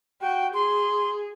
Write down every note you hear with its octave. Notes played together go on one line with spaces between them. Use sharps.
F#4 G5
G#4 C6